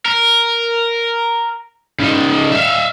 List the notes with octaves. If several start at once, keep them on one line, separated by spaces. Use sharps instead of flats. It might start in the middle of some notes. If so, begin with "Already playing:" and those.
A#4
C#3 D#4
E5 F5